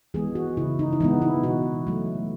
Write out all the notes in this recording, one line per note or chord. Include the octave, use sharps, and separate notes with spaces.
E3 G#3 B3 G#4
F#4
C#3 E4
D#4
E4
E3 G#3 B3 D#4
E4
B2 F#4
F#3 A3